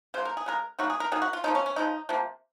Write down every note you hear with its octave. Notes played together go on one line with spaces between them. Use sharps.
C#3 F#3 A#3 C5
A#4
G#4
C#3 G#3 A#4
D#3 F#3 A#3 F#4
G#4
A#4
D#3 F#3 A#3 G#4
F#4
F4
C#3 F3 A#3 D#4
C#4
C#4
C#3 F3 G#3 D#4
C3 F3 A#3